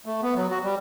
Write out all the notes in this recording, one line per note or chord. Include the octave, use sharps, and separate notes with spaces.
A3
B3
F#3
F#4
G3